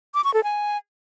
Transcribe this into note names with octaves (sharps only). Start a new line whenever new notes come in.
D6
C#6
A4
G#5